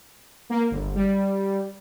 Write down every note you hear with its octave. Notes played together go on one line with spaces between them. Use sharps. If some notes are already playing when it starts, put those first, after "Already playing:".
A#3
G1
G3